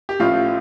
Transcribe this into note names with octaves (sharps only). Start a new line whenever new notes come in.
G4
A1 A2 F3 F4